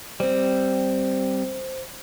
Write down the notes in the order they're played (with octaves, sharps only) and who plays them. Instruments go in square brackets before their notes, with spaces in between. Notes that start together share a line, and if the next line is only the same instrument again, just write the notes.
[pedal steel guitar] G3 C4 [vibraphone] C5